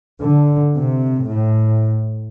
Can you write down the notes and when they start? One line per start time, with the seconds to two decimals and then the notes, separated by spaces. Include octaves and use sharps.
0.21 D3
0.74 C3
1.24 A2